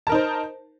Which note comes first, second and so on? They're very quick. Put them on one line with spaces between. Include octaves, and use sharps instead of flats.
A5 A#4 D#4 C5